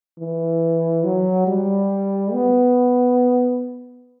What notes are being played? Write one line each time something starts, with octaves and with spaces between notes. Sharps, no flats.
E3
F#3
G3
B3